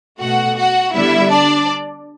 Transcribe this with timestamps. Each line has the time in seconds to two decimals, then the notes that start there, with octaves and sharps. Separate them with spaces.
0.21 B2 A3 F#4 F#5
0.58 F#4 F#5
0.95 D3 G3 B3 E4 E5
1.31 D4 D5